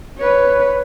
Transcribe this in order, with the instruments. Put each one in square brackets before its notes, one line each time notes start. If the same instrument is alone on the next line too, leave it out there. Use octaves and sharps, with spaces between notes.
[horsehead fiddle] B4 C#5